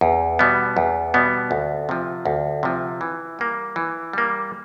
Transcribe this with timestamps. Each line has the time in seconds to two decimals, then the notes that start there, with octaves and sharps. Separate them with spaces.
0.01 E2
0.39 B2 G3 B3
0.77 E2
1.14 B2 G3 B3
1.51 D2
1.89 C3 F3
2.26 D2
2.63 C3 F3
3.01 E3
3.39 G3 A#3
3.76 E3
4.13 G3 A#3